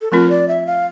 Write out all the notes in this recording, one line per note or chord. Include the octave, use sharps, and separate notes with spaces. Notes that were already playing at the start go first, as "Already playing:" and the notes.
A4
F3 A3 C4 F4 A#4
D5
E5
F5